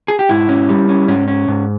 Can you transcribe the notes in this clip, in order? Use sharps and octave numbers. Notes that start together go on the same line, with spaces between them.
G#4
G4
G#2 E4
C#4
G3
C#4
G#2 C#4
C#4
G#2